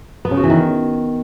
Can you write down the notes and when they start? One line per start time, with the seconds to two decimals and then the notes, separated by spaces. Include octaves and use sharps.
0.25 B3
0.31 C#3
0.37 F#4
0.43 E3
0.50 D#3